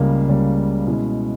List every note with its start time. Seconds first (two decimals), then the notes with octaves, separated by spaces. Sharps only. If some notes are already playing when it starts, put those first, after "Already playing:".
Already playing: C#2 C#3 G3 A#3
0.29 C#2 C#3 G3 A#3
0.86 B2 G#3 C#4 E4